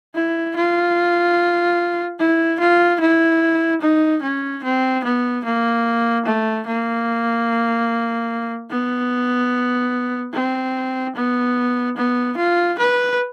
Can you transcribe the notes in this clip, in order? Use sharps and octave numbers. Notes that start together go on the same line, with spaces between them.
E4
F4
E4
F4
E4
D#4
C#4
C4
B3
A#3
A3
A#3
B3
C4
B3
B3
F4
B4